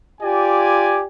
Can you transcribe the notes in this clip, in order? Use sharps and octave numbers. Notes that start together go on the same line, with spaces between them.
F4 G4 D5 G#5